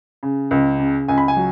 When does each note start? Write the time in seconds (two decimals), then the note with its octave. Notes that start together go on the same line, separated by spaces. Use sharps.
0.23 C#3
0.51 C#2
0.79 C#3
1.08 C#2 G#5
1.18 B5
1.28 G#5
1.36 F#3